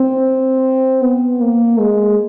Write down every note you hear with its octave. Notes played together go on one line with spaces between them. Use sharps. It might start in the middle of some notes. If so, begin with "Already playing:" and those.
Already playing: C4
B3
A#3
G#3